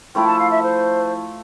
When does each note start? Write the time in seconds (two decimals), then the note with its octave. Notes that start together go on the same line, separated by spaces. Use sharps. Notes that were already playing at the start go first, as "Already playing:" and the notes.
0.14 F3 A3 E4 A4 G5
0.27 A5
0.38 F5
0.50 E5
0.62 C5